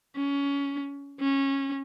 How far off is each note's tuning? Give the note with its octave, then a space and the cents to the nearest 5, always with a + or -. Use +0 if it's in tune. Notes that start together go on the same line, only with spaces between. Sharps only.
C#4 +20
C#4 -15